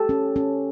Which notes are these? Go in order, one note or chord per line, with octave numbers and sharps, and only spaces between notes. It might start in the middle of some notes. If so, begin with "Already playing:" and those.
Already playing: G4 A4
C#4
C#4